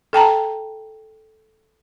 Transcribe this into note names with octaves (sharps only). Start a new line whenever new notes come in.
A4 G5 A5 A#5